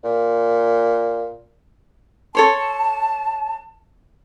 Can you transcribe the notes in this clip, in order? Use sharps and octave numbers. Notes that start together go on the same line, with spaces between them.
A#2
A4 C#5 A5 C6